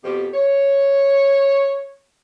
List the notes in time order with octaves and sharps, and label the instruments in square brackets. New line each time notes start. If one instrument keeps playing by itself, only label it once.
[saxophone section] F2 B2 G4
C#5